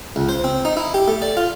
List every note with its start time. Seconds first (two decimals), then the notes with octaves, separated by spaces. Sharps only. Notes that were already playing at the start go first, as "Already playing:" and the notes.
0.16 C#2
0.29 C5
0.44 C4
0.65 D#4
0.77 E4
0.94 G4
1.08 A3
1.22 D5
1.37 F4